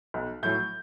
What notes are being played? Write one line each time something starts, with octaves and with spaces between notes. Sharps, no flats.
B1
A2 F#3 G6